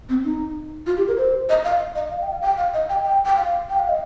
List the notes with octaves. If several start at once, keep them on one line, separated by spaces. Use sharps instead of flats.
C4
D#4
F4
G4
A#4
C5
D#5
F5
D#5
F5
G5
F5
G5
F5
D#5
G5
G5
G5
F5
G5
F5
D#5